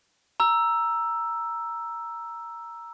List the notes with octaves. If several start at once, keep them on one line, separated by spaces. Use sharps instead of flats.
A#5 E6